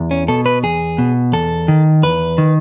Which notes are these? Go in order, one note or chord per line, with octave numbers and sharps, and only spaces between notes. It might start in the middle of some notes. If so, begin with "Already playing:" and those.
Already playing: E2
C#4
B2 A4
B4
E2 G#4
B2
E2 A4
D#3
E2 B4
D#3